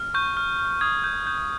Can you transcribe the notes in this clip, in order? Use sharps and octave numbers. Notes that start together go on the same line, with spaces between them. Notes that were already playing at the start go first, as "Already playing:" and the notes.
Already playing: F6
C#6 G6
F6
F6
D#6 G#6
G6
G6